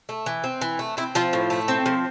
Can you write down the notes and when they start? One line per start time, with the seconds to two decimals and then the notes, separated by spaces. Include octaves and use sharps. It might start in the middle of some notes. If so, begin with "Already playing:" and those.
0.09 A3
0.26 E3
0.44 C4
0.61 E3
0.79 A3
0.97 C4 E4
1.15 F3 F4
1.33 A2
1.50 A3
1.68 C4
1.86 F3